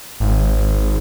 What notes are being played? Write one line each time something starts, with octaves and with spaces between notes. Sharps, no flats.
G#1